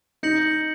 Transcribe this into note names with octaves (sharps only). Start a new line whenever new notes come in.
D#4 G6 A#6 C#7 F#7